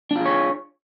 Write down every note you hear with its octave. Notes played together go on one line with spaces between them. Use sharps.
D4 F4 G#4 C#5